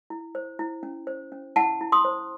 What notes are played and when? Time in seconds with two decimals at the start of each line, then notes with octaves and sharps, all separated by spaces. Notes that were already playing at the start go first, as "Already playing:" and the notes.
0.10 E4
0.35 C5
0.59 E4
0.83 C#4
1.07 C5
1.32 C#4
1.56 E4 F#5 A5
1.81 E4
1.92 C6 D#6
2.05 C5